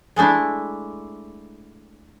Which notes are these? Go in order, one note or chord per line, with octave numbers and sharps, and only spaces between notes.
G#3 A3 D4 E4